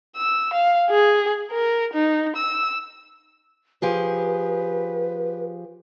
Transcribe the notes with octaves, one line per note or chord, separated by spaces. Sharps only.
E6
F5
G#4
A#4
D#4
E6
F3 G4 G#4 B4